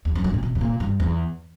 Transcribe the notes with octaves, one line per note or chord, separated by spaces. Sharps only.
E2
F#2
G2
A#2
B2
G2
A#2
G2
E2